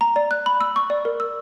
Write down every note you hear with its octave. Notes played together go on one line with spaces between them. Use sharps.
A#5
D5
F#6
B5
E6
C#6
D5
A#4
E6